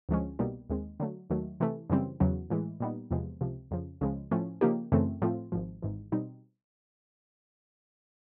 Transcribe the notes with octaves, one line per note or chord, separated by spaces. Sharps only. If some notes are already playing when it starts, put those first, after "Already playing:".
D2 D3 F3 G#3 C#4
C2 B2 G3 A#3 D#4
D#2 D#3 G#3 C4
D3 F#3 A3
D#2 D#3 F#3 A3
C3 E3 A3
F#2 C#3 E3 G3 C4
E2 C#3 F#3
A2 E3 G#3
A#2 G3 B3 D#4
E2 C3 F3 G#3 B3
C#2 C3 F3
F2 C#3 F3
C#2 C#3 F3 G#3
A2 F3 A3 C#4
C#3 F3 A#3 D#4 G4
F#2 C#3 E3 A3 C4
A2 F3 A3 C4 F4
G#1 G#2 F3
G#1 G#2 E3
B2 G3 C4 D#4